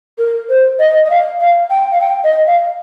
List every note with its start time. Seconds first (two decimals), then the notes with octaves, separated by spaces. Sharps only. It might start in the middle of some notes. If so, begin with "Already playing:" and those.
0.18 A#4
0.49 C5
0.79 D#5
1.05 D#5
1.10 F5
1.40 F5
1.70 G5
1.92 F5
2.01 G5
2.24 D#5
2.47 F5